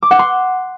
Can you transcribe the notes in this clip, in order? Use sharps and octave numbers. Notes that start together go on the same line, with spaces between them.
D6
F#5
C6